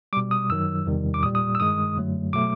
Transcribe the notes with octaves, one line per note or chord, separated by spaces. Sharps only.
B2 G3 D6
D#6
F#2 D#3 F#3 E6
E2 C3 D#3 G3
D6
A#2 G3 D#6
D#6
E6
G2 D#3 G#3 D#6
F#2 D3 F#3 A3
B2 F#3 A3 D6